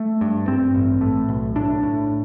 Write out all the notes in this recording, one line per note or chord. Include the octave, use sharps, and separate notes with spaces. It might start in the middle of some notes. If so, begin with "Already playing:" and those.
Already playing: A3
G2
G2 C4
A1
A2
B1
A2 D4
A2